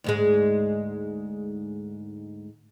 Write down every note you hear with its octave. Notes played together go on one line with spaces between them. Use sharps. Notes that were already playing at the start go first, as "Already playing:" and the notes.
D2 G#2 G#3